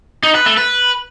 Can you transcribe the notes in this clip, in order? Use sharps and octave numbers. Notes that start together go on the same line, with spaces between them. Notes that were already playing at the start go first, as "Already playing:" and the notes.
D#4
B4
A3
B4